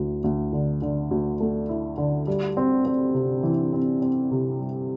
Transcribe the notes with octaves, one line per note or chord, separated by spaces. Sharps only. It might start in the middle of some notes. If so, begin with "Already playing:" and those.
Already playing: D2 E4
D2
D3
D3
D2
A3
E4
D3
G3
C4
C4
C3
E3
C4
C4
C3
G3